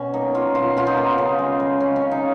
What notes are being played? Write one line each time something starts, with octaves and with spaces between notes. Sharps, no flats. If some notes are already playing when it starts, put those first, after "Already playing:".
Already playing: B2 C#4
A#3 D#4
A#3 F4
B2 F4
B2 F4
D#4
A#3
C#3
G#3
G#3
C#3 C#4
C#4
C#3
D#4